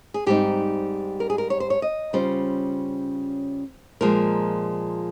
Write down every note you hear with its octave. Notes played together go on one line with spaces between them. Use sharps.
G#4
G#2 G3 C4 D#4 G4
A#4
G#4
A#4
C#5
C5
C#5
D#5
C#3 G3 C#4 F4 C5
A#2 F3 G#3 A#4